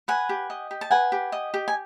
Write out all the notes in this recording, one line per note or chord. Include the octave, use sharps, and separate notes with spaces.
B4 F#5 G#5
G4
D#5
G4
A5
B4 F#5 G#5
G4
D#5
G4
G#5